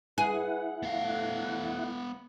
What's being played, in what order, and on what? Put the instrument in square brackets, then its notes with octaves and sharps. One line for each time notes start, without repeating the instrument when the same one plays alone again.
[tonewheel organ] E4 F#5 [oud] G#4 [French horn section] B4
[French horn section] G2 F3 A3 [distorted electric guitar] B3 F5